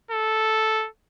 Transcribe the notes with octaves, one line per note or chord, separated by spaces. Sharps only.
A4